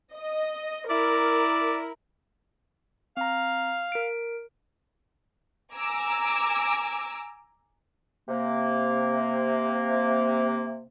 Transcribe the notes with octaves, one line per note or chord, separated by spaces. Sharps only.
D#5
E4 A#4 D5
C4 F5 A#5
A#4 D7
G#5 A#5 D6 E6
C3 A#3